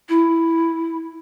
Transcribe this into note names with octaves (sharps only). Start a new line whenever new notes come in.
E4